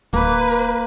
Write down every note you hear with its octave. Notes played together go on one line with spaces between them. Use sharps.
D1 A#3 B4